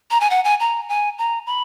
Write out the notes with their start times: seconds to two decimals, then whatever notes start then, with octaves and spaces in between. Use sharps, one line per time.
0.11 A#5
0.20 G#5
0.30 F#5
0.45 G#5
0.60 A#5
0.89 G#5
1.18 A#5
1.47 B5